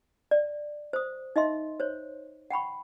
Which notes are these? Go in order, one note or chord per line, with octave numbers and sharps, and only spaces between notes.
D5
C5 D#6
D#4 D#5 E5 C6
C5 C#5
F#5 G5 B5 C#6